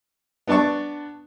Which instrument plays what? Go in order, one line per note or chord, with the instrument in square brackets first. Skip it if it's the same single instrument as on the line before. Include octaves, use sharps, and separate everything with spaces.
[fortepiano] B3 D4 D5 A5 C#6